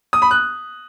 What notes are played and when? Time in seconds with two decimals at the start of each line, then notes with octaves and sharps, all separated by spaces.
0.13 D#6
0.22 B5
0.31 F#6